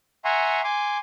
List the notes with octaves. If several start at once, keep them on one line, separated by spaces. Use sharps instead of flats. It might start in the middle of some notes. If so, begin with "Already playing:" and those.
E5 F#5 G#5 A#5 C6 C#6
G#5 C6 D6